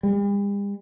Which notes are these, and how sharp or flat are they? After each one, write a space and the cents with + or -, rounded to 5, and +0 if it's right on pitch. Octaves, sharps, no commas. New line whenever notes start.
G3 +45